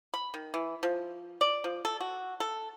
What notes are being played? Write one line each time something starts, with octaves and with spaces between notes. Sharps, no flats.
B5
D#3
E3
F3
D5
F3
A4
F#4
A4